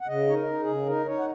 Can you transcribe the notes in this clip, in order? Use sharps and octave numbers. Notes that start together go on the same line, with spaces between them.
F#5
C#3 D#5
D#4 C#5
A#4
D#4
G#4
C#3
D#4 A#4
D#4 C#5
F#5